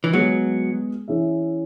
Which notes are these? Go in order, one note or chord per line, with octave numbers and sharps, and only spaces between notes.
E3
F#3 G#3 B3 G#4 B4
E3 C#4 G#4 E5